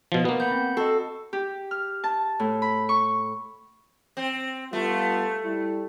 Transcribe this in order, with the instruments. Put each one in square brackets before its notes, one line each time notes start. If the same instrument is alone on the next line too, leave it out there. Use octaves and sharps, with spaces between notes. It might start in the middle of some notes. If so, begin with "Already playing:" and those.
[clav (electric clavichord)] B2 F3
A#3 B3
[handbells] F#5 B5 G6
C4
[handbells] F#4 D#5 [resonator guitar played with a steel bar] A4
[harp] G4
F6
A5
A2
B5
C#6
[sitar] C4
[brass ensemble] G3 B3 F4 [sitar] A3
[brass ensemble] G3 E4